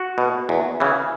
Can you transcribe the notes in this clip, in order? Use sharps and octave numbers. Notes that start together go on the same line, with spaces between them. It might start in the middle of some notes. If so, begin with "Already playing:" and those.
Already playing: F#4
B2
E2
C#3 E3